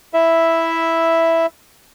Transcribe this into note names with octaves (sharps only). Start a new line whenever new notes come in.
E4 E5